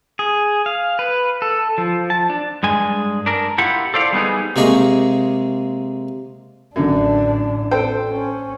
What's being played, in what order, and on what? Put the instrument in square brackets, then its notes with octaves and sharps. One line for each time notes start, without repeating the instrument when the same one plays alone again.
[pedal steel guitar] G#4
F5
B4
A4
F3
A5
D4
[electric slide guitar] G2 G#3 G#5
D4 A#4
E4 F4 G4 F#5
A4 C5 D5 F5
G3 B3 D#4 G#4
[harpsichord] C3 G#3 A#3 G#4 D#5 C#6
[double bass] A1 D4 [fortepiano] F#2 D3
[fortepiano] A4 C5 G5
[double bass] C#4